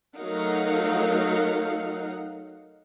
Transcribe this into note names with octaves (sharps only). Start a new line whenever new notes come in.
F#3 A3 D#4 A#4 F5 F#5